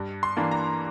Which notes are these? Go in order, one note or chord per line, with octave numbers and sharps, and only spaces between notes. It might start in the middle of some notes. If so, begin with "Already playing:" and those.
Already playing: G2
C6
E3 A#3 D4
A#5